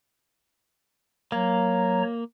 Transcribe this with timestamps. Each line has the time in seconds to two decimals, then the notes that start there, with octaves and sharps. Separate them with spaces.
1.32 F#3 A#3 C#5 A#5